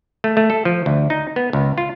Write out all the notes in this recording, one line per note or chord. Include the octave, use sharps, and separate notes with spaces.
A3
A3
A4
F3
D2
D#4
B3
C#2
F4